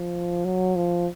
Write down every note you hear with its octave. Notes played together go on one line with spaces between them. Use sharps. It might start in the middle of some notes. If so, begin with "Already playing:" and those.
Already playing: F3
F#3
F3